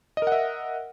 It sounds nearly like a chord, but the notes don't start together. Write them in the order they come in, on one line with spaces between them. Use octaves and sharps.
D#5 A#4 F#5 E5